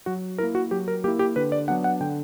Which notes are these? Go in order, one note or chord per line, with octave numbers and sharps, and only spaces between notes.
F#3 F#4
A#3 E4 A#4
F#4
F#3 G4
A#4
A#3 E4 G4
G4
D3 B4
D5
F#3 B3 D4 F#5
F#5
D3 G5